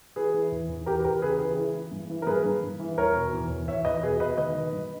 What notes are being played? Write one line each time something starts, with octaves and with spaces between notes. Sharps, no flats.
E3 G#4 B4
E3
E2
E2
E2 G4 A#4
B4
E2 G4 A#4
C#3 G#4 B4
E3 G#4 B4
E3
E3
G2
E3
A#4
G2 G#4 B4
G2
G2
E3
E2 A#4 C#5
B2
E2
E2
E2 C#5 E5
E2 B4 D#5
B2 G#4 B4
B2 B4 D#5
D#3 B4 D#5
D#3
G2